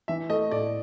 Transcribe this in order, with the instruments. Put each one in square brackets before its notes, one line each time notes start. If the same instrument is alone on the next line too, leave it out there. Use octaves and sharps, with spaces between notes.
[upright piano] E3 [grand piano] E5
[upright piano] A3 [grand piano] D#5
[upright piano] A2 [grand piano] D5